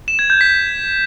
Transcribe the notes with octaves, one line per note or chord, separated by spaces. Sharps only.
E7
G#6
G6
B6